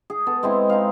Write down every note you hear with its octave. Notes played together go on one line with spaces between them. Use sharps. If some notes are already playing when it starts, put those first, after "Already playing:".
G#4
B3 A4
G#3 C4 E4
D#4 F5